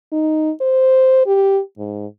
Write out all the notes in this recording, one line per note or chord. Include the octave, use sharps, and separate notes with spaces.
D#4
C5
G4
G#2